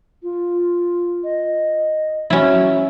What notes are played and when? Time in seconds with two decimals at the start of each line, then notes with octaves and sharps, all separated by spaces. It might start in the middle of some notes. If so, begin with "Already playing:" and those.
0.23 F4
1.24 D#5
2.30 F#3 C#4 E4